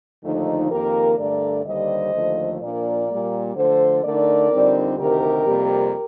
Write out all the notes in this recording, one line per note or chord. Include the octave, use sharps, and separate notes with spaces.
D#2 D3 F3 A3 D#4
F2 D#3 A#3 G4 A#4
G2 D3 A3 A#4 D5
D#2 D3 G3 D4 C5 D#5
D#2 D3 F3 A3
A#2 F3 A#3 D4 A#4 D5
A#2 G3 A#3
D3 F3 A3 A4 C5
D3 A3 D#4 A#4 D5
F2 D3 G3 C4 D#4
D2 C3 D#3 G4 A#4
F2 C3 G3 A#3